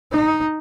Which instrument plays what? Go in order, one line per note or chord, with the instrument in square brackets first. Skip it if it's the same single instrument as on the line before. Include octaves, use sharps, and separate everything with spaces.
[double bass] D#4